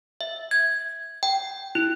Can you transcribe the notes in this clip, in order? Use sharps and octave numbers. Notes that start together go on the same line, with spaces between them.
E5
G#6
G5
E4